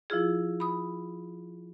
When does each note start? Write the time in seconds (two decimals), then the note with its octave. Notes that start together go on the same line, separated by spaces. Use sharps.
0.10 F3 E4 F4 G#4
0.60 B5 D#6